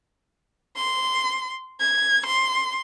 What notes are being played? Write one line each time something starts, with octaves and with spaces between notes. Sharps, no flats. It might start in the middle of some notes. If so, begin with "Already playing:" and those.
C6
G#6
C6